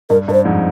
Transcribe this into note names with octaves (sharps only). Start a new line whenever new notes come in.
G2 A#4
G2 A#4
C5
F2 G#2